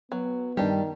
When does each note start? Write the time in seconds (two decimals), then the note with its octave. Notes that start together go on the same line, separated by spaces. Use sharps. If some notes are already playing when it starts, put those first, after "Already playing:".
0.12 F#3 B3
0.57 G2 D#3 G3 D4 G4